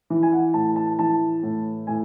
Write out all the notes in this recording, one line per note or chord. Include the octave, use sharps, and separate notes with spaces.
E3
G#5
F#5
A2 A5
A5
E3 A5
A2
A2 G#5